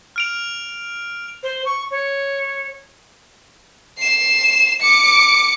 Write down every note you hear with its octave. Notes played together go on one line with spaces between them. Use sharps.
F6 D7 F7
C5
C#6
C#5
C7 E7
D6 C#7